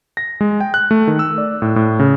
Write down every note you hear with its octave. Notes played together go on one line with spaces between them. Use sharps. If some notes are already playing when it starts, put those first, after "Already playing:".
A#6
G#3
G5
F#6
A3
D#3
E6
D5
A2
A2
C#3